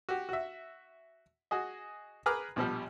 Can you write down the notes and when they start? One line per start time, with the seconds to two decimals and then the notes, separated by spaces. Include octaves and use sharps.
0.09 F#4 G4
0.29 F#4 E5
1.51 F#4 G#4 D#5
2.26 G#4 A#4 B4 A#5 D6 F6
2.56 A#1 B2 F3 G3